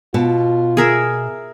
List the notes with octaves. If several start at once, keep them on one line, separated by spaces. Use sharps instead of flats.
B2 B3 F4 A5
G#4 A#4 E5